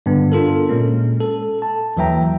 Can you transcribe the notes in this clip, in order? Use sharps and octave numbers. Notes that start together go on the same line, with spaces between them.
G2 D3 B3
D4 F4 A4 A#4
A#2 G#3 C#4
A4
A5
D#2 E3 F#3 E5 G5 A#5